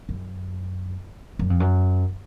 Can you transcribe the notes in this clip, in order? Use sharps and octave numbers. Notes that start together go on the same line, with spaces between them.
F#2
F#2
F2
F#2